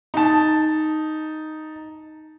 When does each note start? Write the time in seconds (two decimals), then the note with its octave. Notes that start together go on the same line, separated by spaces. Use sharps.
0.14 D#4 A5